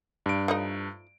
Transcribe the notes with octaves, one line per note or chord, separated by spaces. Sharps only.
G2 D7
F3 A3 D#4